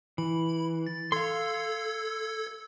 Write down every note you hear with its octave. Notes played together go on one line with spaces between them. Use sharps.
E3 B5
A6
A4 F5 C6 E6 G#6